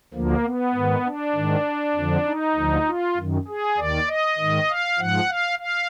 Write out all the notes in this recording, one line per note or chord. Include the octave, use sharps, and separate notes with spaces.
D2 D3 F3 A#3
B3
G#2 D#3
D4
G#2 D#3
F2 D3 F3
D#4
D2 D3 F3
F4
F#2 D#3
G#4
D#2 D#3 D5
D#5
G#2 D#3
F5
G#2 F3 F#5
F5
F5